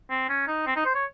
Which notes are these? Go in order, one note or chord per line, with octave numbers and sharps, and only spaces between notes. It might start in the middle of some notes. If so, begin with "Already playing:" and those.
C4
C#4
D#4
C4
D#4
C5
C#5